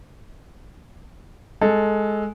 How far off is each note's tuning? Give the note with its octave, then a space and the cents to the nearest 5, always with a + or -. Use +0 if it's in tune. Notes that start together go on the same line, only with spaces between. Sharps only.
G#3 +10 A4 +0